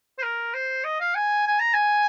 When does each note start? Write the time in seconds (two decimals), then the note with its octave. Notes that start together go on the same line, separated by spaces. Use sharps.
0.18 C5
0.23 A#4
0.54 C5
0.84 D#5
1.00 F5
1.15 G#5
1.47 G#5
1.60 A#5
1.74 G#5